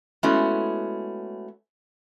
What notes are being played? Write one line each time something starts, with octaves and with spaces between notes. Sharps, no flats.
G#3 A3 B3 C#4 E4 F#4